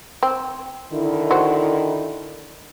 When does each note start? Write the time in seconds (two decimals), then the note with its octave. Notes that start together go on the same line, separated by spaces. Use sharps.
0.23 C4
0.92 D3 D#3 E4
1.31 F#4 C5